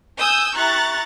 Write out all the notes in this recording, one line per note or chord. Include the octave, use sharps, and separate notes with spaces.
G#5 D#6 E6 G6
E4 G4 A#5 C#6 F#6 A6